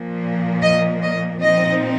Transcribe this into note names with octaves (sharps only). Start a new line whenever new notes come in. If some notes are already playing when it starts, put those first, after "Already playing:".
Already playing: A#2 F3 A#3
D#5
D#5
A#2 F3 C4 D#4 D#5